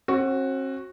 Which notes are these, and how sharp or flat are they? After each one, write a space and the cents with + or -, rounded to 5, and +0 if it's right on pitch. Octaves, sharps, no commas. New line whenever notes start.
C4 +45 F#4 +0